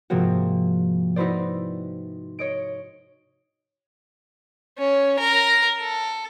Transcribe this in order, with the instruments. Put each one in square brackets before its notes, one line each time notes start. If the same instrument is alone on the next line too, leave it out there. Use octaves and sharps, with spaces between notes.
[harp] G#2 C3 F3 A#3 C4 F#4
D#4 E4 F#4 B4 C5 D5
C#5 D#5 D7
[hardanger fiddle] C#4
A#4
A4